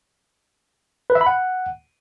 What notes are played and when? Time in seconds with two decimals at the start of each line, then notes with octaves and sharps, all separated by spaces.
1.10 B4
1.15 E5
1.21 B5
1.26 F#5